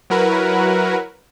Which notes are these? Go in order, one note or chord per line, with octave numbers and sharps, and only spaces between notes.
F#3 E4 F#4 A#4 B4